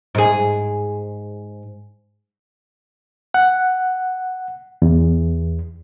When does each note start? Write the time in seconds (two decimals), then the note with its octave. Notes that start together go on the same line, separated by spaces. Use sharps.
0.15 G#2 G#4
3.34 F#5
4.82 E2